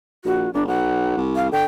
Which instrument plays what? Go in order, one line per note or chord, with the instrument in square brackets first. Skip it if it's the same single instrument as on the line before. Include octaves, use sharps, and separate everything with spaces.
[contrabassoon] A#1 [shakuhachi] F#4
[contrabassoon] G1 [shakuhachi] D4
[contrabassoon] B1 [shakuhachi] F#5
[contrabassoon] C2
[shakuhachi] F5
[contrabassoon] D3 [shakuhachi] G5